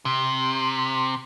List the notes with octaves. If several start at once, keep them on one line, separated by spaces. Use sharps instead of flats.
C3